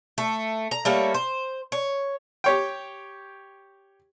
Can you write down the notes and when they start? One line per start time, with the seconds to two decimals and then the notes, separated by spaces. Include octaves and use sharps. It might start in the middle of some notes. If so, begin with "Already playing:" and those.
0.18 A3
0.71 A#5
0.85 G3 A3 A#3 C#5
1.14 C5
1.72 C#5
2.44 G4 C#5 G5